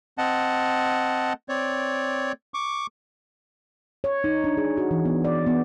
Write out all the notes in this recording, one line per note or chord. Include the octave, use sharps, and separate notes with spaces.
C4 D#5 F#5 A5
C4 C#5 D5
C#6 D6
C#5
D#4
D4
G#4
F#4
E3
B3
D5
B3